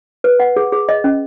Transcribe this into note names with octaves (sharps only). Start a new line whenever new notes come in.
B4
F#5
G#4
G#4
D#5
C#4